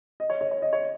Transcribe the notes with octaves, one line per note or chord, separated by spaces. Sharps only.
D#5
C#5
C#5
C#5
D#5
C#5